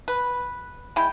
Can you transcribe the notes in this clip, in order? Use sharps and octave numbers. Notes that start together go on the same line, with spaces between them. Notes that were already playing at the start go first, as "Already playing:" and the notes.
B4
G#3 E4 G5